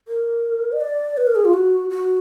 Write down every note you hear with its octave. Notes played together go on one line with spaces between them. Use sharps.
A#4
D#5
D5
B4
A#4
G#4
F4
F#4
F#4